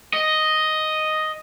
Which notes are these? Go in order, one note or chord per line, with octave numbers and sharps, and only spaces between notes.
D#5